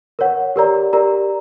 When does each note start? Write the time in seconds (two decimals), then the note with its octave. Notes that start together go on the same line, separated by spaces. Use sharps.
0.19 A#4 C#5 F#5
0.56 G4 A#4 D5 A#5
0.93 G4 A#4 D5 A#5